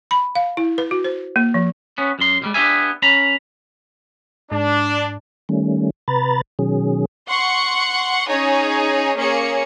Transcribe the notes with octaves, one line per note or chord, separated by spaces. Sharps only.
B5
F5
E4
B4
F#4
C5
A#3
F3
B3 C#4
F#2 C6
C2 G3 G#3
B3 D4 G4 E5 G#5
C#4 A#5 B5
G#2 D4
D#3 G3 A3 C#4
C3 B4 A#5 B5 A6
B2 D#3 F#3 C#4 G#4
F#5 C6 C#6 C#7
C#4 D#4 G#4 C#5 G#5
A#3 C#4 G#4 C#5 C#7